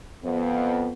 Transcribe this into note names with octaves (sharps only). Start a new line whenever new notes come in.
F2 B3